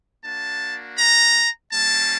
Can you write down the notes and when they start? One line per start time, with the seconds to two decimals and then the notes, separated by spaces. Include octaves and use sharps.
0.24 A#3 D4 F#4 A5
0.98 A#5
1.73 G3 A#3 C#4 A5